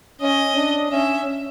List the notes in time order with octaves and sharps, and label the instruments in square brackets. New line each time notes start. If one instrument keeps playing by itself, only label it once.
[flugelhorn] C#4 [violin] D#5
[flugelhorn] D4
[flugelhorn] C#4 [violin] E5